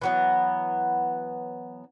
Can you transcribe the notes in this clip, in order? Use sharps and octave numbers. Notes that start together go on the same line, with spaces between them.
E3 F#3 B3